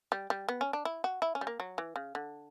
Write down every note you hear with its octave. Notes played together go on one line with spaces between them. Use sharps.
G3
G3
B3
C#4
D4
E4
F#4
E4
C#4
G3
A#3
F#3
E3
C#3
D3